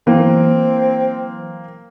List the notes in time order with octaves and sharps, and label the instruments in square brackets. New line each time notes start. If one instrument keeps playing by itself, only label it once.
[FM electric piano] E3 F#3 [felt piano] A#3 [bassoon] C4